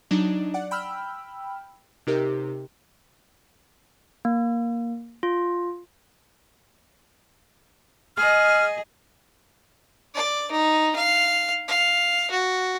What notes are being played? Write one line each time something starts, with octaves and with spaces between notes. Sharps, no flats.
F#3 D4 D#4
D5 F#5
G5 B5 E6 F6
C3 D#4 G4 A#4
A#3
F4
G#4 D#5 F6
D5
D#4
F5
F5
F#4